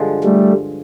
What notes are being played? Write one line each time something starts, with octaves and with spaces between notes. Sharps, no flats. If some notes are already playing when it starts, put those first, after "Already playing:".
Already playing: G2 D3 F3 G#3
G3 A3